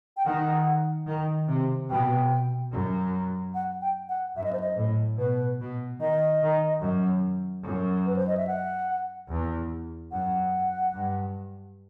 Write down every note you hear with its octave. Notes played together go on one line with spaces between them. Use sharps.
G5
D#3 F#5
D#3
C3
B2 G5
F#2
F#5
G5
F#5
F#2 E5
D#5
C5
D#5
A2
B2 B4
B2
D#3 D#5
D#3
F#2
F#2
B4
C5
D#5
E5
F#5
E2
F#2 F#5
G2